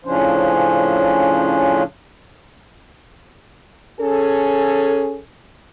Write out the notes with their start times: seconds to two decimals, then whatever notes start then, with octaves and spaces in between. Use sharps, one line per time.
0.05 A2 C#3 F3 C#4 D4 C5
4.00 C#4 G#4 A4